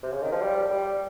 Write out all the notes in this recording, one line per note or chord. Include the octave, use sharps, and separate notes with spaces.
C3
C#3
D#3
F3
G3
G3